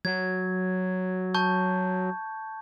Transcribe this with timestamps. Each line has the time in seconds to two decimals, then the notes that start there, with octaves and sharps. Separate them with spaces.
0.05 F#3 G#6
1.34 A5 C#6 G6